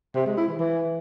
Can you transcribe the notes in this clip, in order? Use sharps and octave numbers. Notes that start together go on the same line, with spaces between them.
C3
G#3
E4
E3
E3